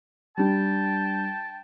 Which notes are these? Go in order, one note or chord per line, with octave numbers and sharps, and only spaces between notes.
G3 D4 G5 A5